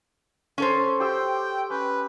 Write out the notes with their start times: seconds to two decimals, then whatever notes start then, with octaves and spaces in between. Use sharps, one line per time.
0.58 C#4 A4 C5
1.00 G4 G5 C6 E6
1.70 C#4 B4